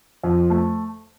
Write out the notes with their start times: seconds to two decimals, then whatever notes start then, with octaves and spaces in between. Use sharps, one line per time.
0.24 F2
0.50 A3